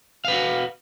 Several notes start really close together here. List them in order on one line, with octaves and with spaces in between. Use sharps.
F5 B4 F#4